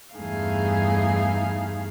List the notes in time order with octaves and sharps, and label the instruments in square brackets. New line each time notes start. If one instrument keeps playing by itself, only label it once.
[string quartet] E2 G2 A3 D#4 G#4 F5